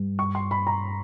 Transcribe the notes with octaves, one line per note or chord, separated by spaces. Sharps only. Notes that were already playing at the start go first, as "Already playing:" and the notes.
Already playing: G2
C#6
C6
B5
A#5